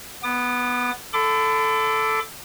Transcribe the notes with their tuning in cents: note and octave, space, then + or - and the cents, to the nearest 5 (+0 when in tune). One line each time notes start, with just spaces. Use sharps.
B3 +0 D6 +45
A4 +0 B5 +40 D6 +0